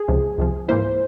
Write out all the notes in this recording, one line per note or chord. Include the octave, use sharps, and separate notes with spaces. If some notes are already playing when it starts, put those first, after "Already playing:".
Already playing: G#4
C#2 C3 F3
C#2 C3 F3
G#2 E3 A#3 E4 C5